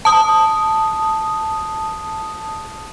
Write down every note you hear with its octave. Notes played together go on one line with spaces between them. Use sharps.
A5 D#6